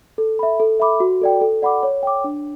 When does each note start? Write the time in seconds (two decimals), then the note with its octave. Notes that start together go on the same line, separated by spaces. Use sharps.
0.18 A4
0.39 E5 B5
0.60 A4
0.80 E5 B5 D6
1.00 F#4
1.22 A4 D5 G5
1.41 A4
1.62 D5 F#5 B5 D6
1.83 C#5
2.03 G5 D6
2.24 D4